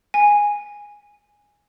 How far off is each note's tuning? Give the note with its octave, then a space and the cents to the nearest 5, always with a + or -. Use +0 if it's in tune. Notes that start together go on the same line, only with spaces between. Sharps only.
G#5 -10